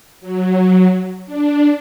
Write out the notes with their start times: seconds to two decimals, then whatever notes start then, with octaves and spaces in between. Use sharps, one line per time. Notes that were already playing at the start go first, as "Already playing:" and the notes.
0.21 F#3
1.26 D4